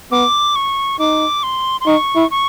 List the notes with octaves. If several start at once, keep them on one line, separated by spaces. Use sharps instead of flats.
B3 D6
C#6
D#4 D6
C6
C6
D#4 C#6
E4
C#6